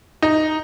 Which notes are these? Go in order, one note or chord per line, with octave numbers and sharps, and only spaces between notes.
D#4